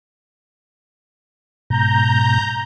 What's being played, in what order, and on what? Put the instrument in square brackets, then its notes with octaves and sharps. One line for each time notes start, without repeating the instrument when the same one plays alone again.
[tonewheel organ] G#2 B2 [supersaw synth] A#5 G6